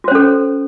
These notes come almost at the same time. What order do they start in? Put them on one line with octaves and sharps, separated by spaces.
F#4 C5 C#4 A4